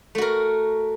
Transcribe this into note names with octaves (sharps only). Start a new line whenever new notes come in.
A3 F#4 A#4